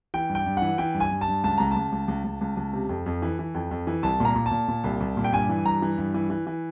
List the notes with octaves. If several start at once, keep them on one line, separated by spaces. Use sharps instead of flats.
E3 G5
G2
G5
G2
E3 F#5
E3 G5
G2
G#5
G2
A5
G2
C#2 A5
C#2 A#5
C#2 A5
C#2
C#2
C#2
C#2
C#2
C3
F2
F2
E3
E3
F2
F2
E3
C2 A5
A#2 A#5
A#2
A5
A#2
A#2
C2
C2
A#2
G5
G2 G#5
E3
G2 A#5
E3
G2
E3
E3
E3